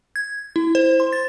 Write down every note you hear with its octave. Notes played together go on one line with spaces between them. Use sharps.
G#6
E4
C5
C6
A6